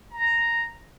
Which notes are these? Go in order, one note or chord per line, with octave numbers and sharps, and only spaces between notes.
A#5